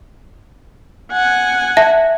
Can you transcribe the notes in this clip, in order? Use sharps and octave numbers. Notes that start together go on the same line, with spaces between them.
F#5 G#5
E5 A5